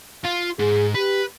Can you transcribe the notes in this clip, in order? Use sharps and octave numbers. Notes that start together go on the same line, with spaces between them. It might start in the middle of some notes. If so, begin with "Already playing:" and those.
F4
G#2 G#4
G4 B4